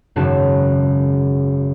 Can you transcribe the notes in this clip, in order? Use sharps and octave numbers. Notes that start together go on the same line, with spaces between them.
G#1 F#2 C#3 F#4 A5 E7